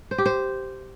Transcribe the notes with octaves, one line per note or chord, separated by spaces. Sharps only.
C5
G4
C5